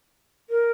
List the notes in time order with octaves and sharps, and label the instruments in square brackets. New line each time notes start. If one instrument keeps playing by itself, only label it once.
[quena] A#4